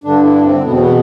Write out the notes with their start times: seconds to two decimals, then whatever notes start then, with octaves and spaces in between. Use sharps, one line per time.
0.04 G2 D3 D4
0.24 E4
0.34 D4
0.44 C4
0.64 E2 B2 B3
0.72 C4
0.81 B3